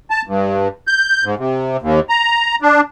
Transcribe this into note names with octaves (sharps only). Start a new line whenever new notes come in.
A5
G2
G6
G#2
C3
D#2
A#5
D4